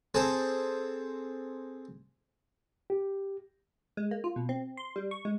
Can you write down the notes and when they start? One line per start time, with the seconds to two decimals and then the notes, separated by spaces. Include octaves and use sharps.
0.14 C4 G#4 A4 C5 A5
2.90 G4
3.97 G#3
4.11 A#3
4.24 F4
4.36 B2
4.49 C4
4.77 C6
4.96 G3
5.11 C#6
5.25 G#3